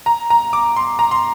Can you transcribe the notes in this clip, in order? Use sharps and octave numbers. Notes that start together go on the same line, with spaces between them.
A#5
A#5
D6
C6
A#5
C6